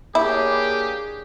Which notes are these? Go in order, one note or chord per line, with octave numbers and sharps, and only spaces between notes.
A#3 D4 E4 G4 G#4 C#5 G5